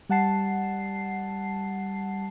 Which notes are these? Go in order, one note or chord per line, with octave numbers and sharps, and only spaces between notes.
G3 F#5 A5 C7